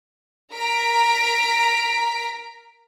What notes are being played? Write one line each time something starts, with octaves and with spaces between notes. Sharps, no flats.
A#4 A#5 B6 D7